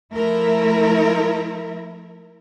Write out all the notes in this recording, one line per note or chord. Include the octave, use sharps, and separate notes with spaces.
F3 A3 E4 A#4